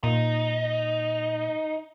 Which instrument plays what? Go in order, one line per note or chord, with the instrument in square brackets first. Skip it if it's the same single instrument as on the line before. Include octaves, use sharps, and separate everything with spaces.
[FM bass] A#2 [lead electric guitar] D#4